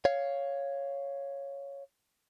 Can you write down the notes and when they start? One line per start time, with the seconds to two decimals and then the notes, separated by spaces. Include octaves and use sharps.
0.05 C#5 F5